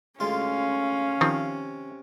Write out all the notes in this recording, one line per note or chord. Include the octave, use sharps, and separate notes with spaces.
D2 G#3 C#4 F4 F5
C3 D#3 F3 C4